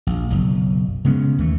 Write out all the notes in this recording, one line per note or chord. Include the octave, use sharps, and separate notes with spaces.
A#1
F#1 B1
C#3 G#3 B3 C#4
D#2 E3 A3